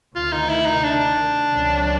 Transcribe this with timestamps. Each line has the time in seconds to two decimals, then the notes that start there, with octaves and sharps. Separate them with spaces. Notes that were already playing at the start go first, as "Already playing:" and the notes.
0.15 D2 C3 D#3 F4
0.32 D#4
0.49 E4
0.66 D#4
0.83 D4
1.51 C#2 C3 D#3 F#3